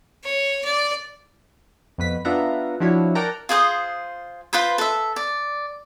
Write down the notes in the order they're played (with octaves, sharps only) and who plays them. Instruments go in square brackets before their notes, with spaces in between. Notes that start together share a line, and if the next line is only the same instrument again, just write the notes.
[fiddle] C#5
D5
[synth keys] F2 B2 B4 B6
B3 D4 F4 E5 F#5 A#5
F3 D4 E4 F#4 C#5
A#4 D5 F#5 G5 A5 A#5
[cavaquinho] F4 G#4 C5 D#6
F4 B4 C5 B5
A4 E5
D5